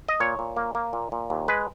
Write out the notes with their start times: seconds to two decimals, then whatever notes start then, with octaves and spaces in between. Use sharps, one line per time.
0.08 D#5
0.20 A#2 C#5
0.39 A#2
0.56 A#3
0.75 A#3
0.93 A#2
1.12 A#2
1.30 D#2
1.48 G#3 B4